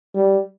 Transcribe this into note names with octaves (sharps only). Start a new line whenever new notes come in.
G3